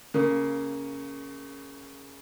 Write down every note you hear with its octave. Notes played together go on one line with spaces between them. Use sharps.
C#3 A#3